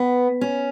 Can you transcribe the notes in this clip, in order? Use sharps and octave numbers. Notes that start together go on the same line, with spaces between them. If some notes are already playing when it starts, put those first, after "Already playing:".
Already playing: B3
C#4